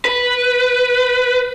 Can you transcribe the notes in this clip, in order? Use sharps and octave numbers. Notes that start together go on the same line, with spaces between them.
B4